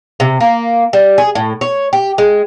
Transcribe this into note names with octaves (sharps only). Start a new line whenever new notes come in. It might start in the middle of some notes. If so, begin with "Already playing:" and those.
C3
A#3
G3
G#4
A2
C#5
G4
G#3